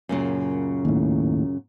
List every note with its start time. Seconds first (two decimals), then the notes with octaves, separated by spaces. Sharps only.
0.09 F#2 A#2 C#3
0.85 D#2 A2